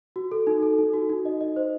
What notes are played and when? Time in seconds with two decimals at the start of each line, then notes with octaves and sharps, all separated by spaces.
0.16 F#4
0.32 A4
0.47 D#4
0.62 A4
0.79 D#4
0.93 F#4
1.10 D#4
1.25 D#5
1.41 D#5
1.56 C5